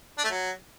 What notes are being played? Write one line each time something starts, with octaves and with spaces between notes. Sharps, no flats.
D4
A3
F#3